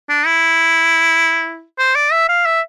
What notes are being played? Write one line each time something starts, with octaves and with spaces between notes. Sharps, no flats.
D4
E4
C5
D5
E5
F5
E5